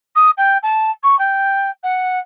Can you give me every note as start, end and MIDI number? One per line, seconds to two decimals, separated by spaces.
0.15 0.30 87
0.37 0.58 79
0.63 0.90 81
1.03 1.18 85
1.19 1.70 79
1.83 2.19 78